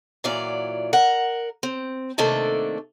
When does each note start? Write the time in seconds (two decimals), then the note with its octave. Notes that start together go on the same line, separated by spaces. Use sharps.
0.24 A#2 E3 F#3 F4 D5
0.93 A#4 F#5
1.63 C4
2.18 C3 D#3 A3 A#3 D4 A4